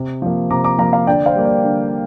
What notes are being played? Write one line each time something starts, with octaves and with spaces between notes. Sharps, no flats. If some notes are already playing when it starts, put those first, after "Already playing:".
Already playing: C3
F3 A#3
C3 A#5 D6
A#5 D6
F3 A#3 F5 A#5
F5 A#5
D3 D5 G5
C5 F5
G3 A#3
D5
D3